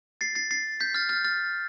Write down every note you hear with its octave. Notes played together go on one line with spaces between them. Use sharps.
A6 C7
A6 C7
A6 C7
G6 B6
F6 A6
F6 A6
F6 A6